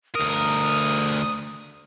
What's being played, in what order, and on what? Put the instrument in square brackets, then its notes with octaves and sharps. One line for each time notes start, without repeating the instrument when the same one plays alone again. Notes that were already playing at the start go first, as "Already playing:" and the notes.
[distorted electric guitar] D2 A#4 [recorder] D#6